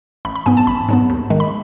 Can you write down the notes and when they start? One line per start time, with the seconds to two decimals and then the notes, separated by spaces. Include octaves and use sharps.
0.25 A1 B5
0.36 B5
0.46 G#2 F#3 B3 G#5
0.57 A5
0.67 A1 B5
0.89 G#2 F#3 B3
1.09 D#2
1.30 D#3 G#3
1.40 B5